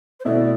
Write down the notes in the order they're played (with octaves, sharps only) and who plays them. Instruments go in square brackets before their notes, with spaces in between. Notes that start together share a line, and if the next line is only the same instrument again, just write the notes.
[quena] C5
[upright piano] B2 A3 E4 [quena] D5